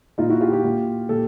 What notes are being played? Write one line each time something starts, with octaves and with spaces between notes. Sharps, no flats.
A#2 D#4 F4
E4 F#4
F4 G4
F4 G4
A#2
A#2 G4 A4